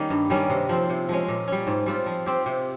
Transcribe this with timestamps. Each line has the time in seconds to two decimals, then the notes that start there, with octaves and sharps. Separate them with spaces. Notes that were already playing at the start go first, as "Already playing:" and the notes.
Already playing: D#3 G3 A#3 C#4 D#4
0.10 G2
0.30 D#3 G3 C#4
0.50 C3
0.69 F3 C4
0.90 C3
1.09 F3 G#3 C#4
1.28 A#2
1.48 G3 C#4
1.67 G#2
1.86 G3 C4 F4
2.06 F3
2.26 C4 G4
2.46 C3